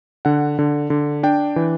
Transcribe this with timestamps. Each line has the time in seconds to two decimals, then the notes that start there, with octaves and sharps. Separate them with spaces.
0.25 D3 F#5
0.59 D3
0.90 D3
1.23 D4 G5
1.56 E3